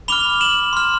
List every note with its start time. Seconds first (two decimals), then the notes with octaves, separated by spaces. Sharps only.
0.08 B5 D6 F6 F7 G7
0.41 E7 F#7
0.73 C6 F6